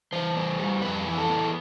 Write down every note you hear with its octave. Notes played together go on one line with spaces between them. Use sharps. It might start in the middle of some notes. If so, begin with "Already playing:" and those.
E3 C5
B3
G3
F2 B4
E3
A4
B3